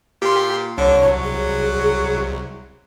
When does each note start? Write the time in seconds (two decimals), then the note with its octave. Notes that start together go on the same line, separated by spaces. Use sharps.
0.22 A#2 G4 C6
0.78 C2 D3 C#5
1.02 F#3
1.24 G#4